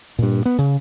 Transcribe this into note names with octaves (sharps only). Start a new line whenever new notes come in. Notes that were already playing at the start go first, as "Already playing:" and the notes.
G2 A#2
B3
C#3